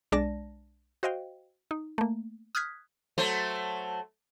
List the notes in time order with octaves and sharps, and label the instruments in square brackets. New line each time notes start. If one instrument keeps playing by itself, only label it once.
[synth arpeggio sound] B1 G#3 D4 D5 A5 A#6
F#4 C5 D#5 F5 G5
D#4
A3 A#3
D#6 F6 F#6 G#6 B6
[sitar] F#3 A3 C5